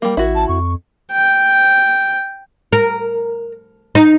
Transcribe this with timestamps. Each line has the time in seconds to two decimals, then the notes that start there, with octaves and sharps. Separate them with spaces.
0.02 G3 A#3 A#4
0.17 A1 E4 F#4
0.35 A5
0.49 F2 C#6
1.13 G5
2.72 A#4
3.95 D#4